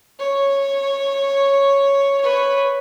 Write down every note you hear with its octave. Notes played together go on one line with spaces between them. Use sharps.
C#5
B4 C#5